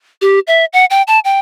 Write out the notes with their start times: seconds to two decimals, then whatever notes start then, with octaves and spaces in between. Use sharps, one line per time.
0.21 G4
0.47 E5
0.73 F#5
0.90 G5
1.08 A5
1.25 G5